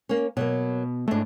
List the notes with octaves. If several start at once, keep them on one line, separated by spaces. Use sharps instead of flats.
A#3 C#4
B2 F#3 A3 A#3
G#2 G#3 A3 D4